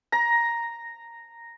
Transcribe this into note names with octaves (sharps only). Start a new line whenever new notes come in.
A#5